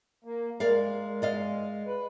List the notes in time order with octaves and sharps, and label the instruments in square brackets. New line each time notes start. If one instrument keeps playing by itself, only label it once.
[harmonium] A#3
[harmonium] G#3 [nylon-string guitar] A#4 D5 F5
[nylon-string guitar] D5 D#5 F5
[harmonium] B4